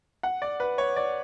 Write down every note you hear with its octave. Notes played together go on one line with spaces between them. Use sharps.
F#5
D5
B4
C#5
D5